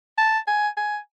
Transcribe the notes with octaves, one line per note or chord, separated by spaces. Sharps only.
A5
G#5
G#5